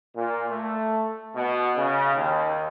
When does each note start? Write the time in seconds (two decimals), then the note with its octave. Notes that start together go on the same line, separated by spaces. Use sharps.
0.15 A#2
0.49 A3
1.34 B2
1.77 C#3
2.16 D#2